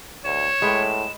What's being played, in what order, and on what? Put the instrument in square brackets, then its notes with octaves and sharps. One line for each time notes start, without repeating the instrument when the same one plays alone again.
[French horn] D2 [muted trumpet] C#5 [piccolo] E7
[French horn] A2 [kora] G#3 B4 G5